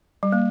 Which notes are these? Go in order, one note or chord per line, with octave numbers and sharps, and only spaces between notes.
G3
A#3